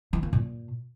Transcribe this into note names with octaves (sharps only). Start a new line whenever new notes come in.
E3
A#3
A#2